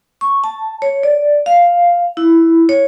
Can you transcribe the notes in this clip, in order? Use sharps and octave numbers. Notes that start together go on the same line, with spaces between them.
C#6
A5
C#5
D5
F5
E4
C#5